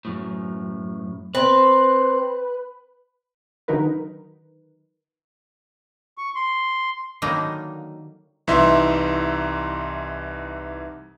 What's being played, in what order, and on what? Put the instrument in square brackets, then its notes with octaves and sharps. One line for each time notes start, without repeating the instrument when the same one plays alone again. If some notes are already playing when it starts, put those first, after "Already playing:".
[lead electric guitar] F#2 A2
[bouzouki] C4 [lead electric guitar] B4
[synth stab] D3 D#3 F#3 D#4 A#4 B4
[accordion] C#6
C6
[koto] D3 D#3 F#3 G3 A#3 D#4
[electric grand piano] C2 E3 D#4 E5 C6